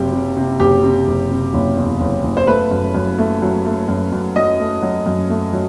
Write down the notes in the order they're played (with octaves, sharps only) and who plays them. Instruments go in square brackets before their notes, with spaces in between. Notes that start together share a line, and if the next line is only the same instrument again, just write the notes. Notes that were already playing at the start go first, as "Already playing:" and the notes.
Already playing: [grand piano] F#1 C3 F#3 G4
C3
C3
F#1 G4
C3
F#1
C3
F#1
E2
F#1
F#1
C5
A3 B4
F#2
F#2
A3
F#3
A3
F#2
F#2
F#3 D#5
A3
F#3
F#2
A3
F#3